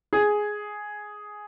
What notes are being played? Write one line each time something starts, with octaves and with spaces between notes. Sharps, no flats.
G#4